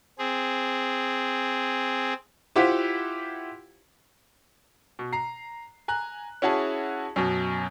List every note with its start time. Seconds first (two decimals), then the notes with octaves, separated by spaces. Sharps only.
0.19 C4 G#4
2.56 E4 F4 G4 C5 E5 F#5
4.99 B2
5.13 A#5 C7
5.88 G#5 A#5 F#6
6.42 C#4 E4 F#4 G#4 A5
7.16 F#2 B2